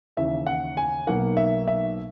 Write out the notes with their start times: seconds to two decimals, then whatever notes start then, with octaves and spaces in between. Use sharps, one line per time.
0.17 D#2 C#3 E3 E5
0.47 F#5
0.77 G#5
1.07 B1 B2 F#3 A#3 D#4 F#5
1.37 E5
1.67 E5